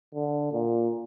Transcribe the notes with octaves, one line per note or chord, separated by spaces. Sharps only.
D3
A#2